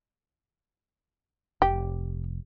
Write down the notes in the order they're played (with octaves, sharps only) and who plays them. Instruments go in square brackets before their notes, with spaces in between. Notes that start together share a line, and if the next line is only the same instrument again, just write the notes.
[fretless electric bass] F1 [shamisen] G4